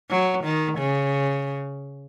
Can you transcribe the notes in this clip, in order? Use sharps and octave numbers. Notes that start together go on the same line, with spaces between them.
F#3
D#3
C#3